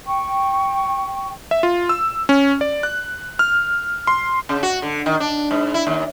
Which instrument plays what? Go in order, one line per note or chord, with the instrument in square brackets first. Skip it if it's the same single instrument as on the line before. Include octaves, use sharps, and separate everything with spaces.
[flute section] G5 C#6
[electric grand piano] E5
F4
E6
C#4
D5
F#6
F6
C6
[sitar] C#3
F#4
D3
D#3
D4
G#2
E4
D#2